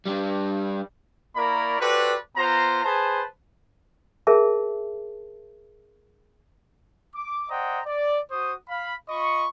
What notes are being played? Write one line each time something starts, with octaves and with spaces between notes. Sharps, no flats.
G3 D4
A#3 E4 A#4 D5 B5 C#6
F#4 G4 A4 B4 C5 D5
B3 F4 C5 A#5
G#4 B4 C5 A5
G#4 A#4 E5 A5
D6
C5 D5 D#5 F#5 G5 A#5
D5
F#4 C5 C#6 D#6
F5 B5
F4 D#5 B5 C#6